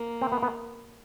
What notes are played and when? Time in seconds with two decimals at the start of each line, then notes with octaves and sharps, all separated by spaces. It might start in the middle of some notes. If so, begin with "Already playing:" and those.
Already playing: A#3
0.21 C4
0.32 B3
0.43 B3